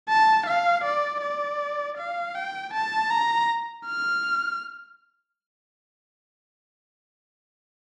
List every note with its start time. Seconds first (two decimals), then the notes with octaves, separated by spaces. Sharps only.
0.09 A5
0.47 F5
0.85 D5
1.22 D5
1.98 F5
2.35 G5
2.74 A5
3.11 A#5
3.87 F6